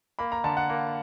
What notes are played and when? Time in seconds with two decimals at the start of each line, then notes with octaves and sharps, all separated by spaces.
0.19 A#3 B5
0.32 A#5
0.44 D3 A5
0.57 F#5
0.69 A#3